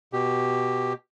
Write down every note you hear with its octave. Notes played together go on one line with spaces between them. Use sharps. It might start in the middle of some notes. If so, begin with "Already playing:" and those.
B2 G4